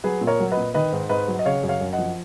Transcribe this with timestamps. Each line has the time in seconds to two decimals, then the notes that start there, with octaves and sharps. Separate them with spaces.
0.04 F#3 G#4 B4
0.21 A#2
0.27 A#4 C#5
0.40 F#3
0.52 B4 D#5
0.57 A#2
0.74 D#3 B4 D#5
0.93 G#2
1.09 G#2 B4 D#5
1.28 F#3
1.39 D#5
1.45 C#3 C#5 F5
1.64 F#2
1.69 C#5 F5
1.81 F#2
1.93 D#5 F#5
1.98 F3